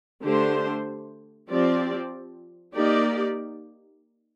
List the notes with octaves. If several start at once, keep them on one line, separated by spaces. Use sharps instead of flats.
D3 A3 D4 G4 C5
F3 C4 G4 D5
A#3 D#4 G4 D5